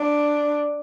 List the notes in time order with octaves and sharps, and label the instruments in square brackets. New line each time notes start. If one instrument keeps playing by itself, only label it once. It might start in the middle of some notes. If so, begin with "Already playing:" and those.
Already playing: [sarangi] D4